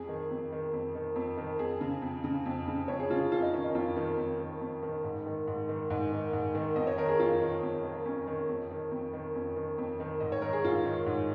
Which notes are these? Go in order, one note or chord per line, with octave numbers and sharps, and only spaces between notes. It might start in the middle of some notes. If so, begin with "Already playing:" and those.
Already playing: F2 G#4
D#3
F2
D#3
F2
D#3
F2
D#3
F2 G#4
C#3
F2
C#3
F2
C#3
F2 C#5
G#4
C#3 F4
G#4
F2 F4
D#4
D#3 C#4
D#4
F2 F4
D#3
F2
D#3
F2
D#3
G#2
D#3
G#2
D#3
G#2
D#3
G#2
D#3
F2 D#5
C#5
D#3 A#4
G#4
F2 F4
D#3
F2
D#3
F2 C#4
D#3
F2
D#3
F2
D#3
F2 C#4
D#3
F2
D#3
G#2 D#5
C#5
D#3 A#4
G#4
G#2 F4
D#3
G#2